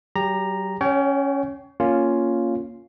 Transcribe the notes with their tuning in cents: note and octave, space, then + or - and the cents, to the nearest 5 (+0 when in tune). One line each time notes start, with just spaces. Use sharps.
F#3 +45 G4 +20 A#5 +0
C#4 +0 C#5 +30 G5 -30
A#3 +0 C#4 +5 F4 +0